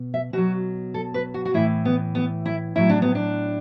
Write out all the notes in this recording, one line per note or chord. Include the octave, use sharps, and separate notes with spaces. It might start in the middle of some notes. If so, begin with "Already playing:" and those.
Already playing: B2
E5
B2 F#3 F#4
A4
B4
F#4
F#4
A2 E3 E4
B3
B3
E4
A2 F#3 E4
D4
B3
D4